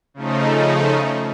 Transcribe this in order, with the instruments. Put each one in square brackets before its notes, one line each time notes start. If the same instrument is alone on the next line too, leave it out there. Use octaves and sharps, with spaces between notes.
[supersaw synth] C#3 F3 A3 D#4